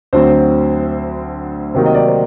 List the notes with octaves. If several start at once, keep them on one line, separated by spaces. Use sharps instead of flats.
D2 D3 F#3 C4 C5
C3 D#3 F#3 A#3 D#4 C5
D#5
D5
C5